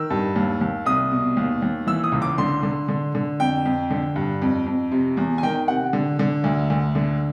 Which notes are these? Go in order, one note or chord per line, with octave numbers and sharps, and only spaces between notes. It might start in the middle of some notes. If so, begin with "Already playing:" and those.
Already playing: D#3 E6
G2
D#2
D#2
C2 D#6
B2
D#2
D#2
E3 E6
D#6
C#2
D6
D3 C6
D3
D3
D3
F2 G5
F2
D3
G2
F2
F2
C3
E2
G#5
D#3 G5
C3 F#5
D3
D3
D2
D2
D3